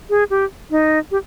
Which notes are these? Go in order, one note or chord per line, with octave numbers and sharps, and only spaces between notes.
G#4
G4
D#4
G4